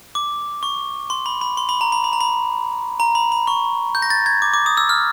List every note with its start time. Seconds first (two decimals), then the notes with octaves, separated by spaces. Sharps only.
0.15 D6
0.63 C#6
1.10 C6
1.26 B5
1.41 B5
1.57 C6
1.69 B5
1.81 A#5
1.92 B5
2.04 B5
2.13 A#5
2.20 B5
3.00 A#5
3.15 B5
3.32 B5
3.47 C#6
3.95 G6
4.02 A#6
4.10 A6
4.26 G#6
4.42 D6
4.54 D6
4.66 D#6
4.77 E6
4.89 F6